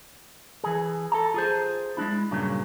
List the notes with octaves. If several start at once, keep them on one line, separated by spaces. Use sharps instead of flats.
E3 G#4
A4 A5 A#5
F4 G#4 C5
G#3 C4 D4 E4
G2 A#2 C#3 F#3